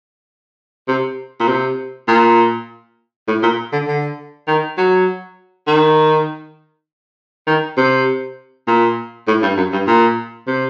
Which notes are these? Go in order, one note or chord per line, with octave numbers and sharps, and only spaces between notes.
C3
A#2
C3
A#2
A2
A#2
D3
D3
D#3
F#3
D#3
D#3
C3
A#2
A2
G2
F#2
G2
A#2
C3